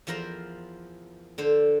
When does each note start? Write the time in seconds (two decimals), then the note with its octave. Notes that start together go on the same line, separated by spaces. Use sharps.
0.07 E2 F3 A#4 C5 A#5
1.38 D3 A4 C5